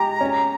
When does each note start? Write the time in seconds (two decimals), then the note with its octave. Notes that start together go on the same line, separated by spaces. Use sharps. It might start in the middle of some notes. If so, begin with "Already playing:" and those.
Already playing: G#3 G4 A#5
0.21 C#4